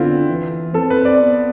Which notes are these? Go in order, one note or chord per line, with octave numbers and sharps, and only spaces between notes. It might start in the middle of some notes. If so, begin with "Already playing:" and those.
Already playing: D3 B3 C4 E4 F4
E3
C4 A4
B4
D5
B3